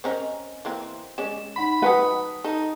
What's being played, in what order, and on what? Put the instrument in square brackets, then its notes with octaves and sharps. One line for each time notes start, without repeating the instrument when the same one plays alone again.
[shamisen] C4 C#4 A#4 [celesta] C5 D#5
[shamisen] E3 A#3 C4
[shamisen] G#3 C#4 D5 [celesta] E7
[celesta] D#4 F#5 C6 [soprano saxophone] B5
[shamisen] F#3 D#4 G5 [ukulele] B4 F#5 [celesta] A5 D#6
[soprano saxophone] D#4 [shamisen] A4